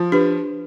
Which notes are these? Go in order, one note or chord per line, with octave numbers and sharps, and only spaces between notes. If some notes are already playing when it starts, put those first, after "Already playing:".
Already playing: F3
D4 G4 B4